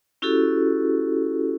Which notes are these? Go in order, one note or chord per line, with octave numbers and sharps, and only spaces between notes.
C#4 E4 F#4 G4 A4